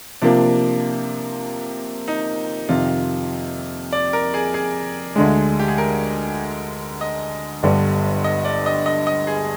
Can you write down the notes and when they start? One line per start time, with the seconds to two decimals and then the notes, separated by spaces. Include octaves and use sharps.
0.22 C3 F3 A#3 D4
2.08 D#4
2.69 F2 C3 D#3 F4
3.93 D5
4.13 A#4
4.34 G#4
4.54 G#4
5.16 D2 D3 G#3
5.59 G4
5.68 G#4
5.78 A#4
7.01 D#5
7.63 G1 G2 D3 G3
8.24 D#5
8.45 D5
8.66 D#5
8.86 D#5
9.07 D#5
9.27 G#4